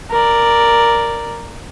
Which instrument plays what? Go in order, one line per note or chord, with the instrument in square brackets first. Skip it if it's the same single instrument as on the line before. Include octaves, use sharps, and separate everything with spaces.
[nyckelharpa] A#4 D5